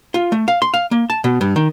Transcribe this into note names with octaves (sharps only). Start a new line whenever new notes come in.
F4
A3
F5
C6
F5
A#3
A5
B2
G2
D#3